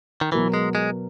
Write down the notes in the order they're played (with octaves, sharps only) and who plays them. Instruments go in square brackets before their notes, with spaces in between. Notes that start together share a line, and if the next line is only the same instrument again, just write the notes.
[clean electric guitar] D#3
[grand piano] B2 F#3 B3 F#4 A#4 [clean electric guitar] E3
[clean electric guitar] G#3
G#3